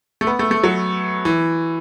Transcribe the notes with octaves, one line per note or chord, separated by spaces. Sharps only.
A3
B3
A3
A3
F#3
E3